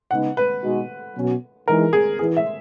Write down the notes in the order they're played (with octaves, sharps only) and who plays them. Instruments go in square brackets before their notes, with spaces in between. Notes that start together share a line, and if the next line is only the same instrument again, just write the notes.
[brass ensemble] C#3 G#3 B3 D#4 [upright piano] F#5
[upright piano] B4
[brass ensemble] B2 G#3 D#4 F#4
B2 F#3 C#4 F#4
[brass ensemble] E3 G#3 D#4 [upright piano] A#4
[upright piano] G#4
[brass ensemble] E3 B3 E4 [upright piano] G#4
[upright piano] E5